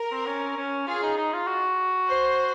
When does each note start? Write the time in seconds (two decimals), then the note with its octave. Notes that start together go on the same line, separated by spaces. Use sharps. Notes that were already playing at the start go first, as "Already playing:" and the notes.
Already playing: A#4
0.12 C4
0.27 C#4
0.57 C#4
0.87 F4 G#4
1.03 D#4
1.17 D#4
1.33 F4
1.47 F#4
2.08 C5